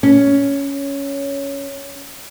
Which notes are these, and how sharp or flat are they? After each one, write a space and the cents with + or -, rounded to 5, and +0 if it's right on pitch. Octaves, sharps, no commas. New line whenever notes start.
C#4 +10